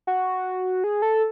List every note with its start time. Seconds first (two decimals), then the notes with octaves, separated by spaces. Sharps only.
0.07 F#4
0.84 G#4
1.02 A4